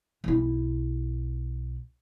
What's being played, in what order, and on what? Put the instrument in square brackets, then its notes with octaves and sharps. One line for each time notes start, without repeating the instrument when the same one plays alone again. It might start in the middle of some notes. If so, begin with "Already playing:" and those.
[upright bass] B1 E4